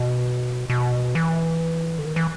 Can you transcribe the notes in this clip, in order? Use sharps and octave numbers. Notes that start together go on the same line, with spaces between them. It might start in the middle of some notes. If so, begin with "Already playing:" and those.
Already playing: B2
B2
E3
D3
D#3
E3